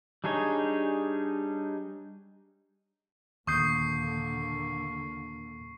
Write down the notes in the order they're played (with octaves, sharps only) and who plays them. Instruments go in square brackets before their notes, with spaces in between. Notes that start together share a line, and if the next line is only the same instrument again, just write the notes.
[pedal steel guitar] G3 D4 D#4 G#4 C#5
[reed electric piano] D#2 D#6 G6 [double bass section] A#2 D3 A#3 [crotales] C#6 C7